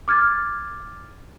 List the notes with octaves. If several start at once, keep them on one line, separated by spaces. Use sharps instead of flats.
D6 F6 G#6 A6